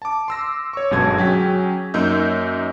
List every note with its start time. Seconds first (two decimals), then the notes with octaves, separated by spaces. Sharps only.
0.02 A5 D6
0.28 C6 E6 A#6
0.73 C#5 C#6
0.91 G1 F#2 B2 G#3 A5 G#6
1.18 F#3 C#4 G#4 G5 B6
1.94 F#2 A#3 D#4 E6 G6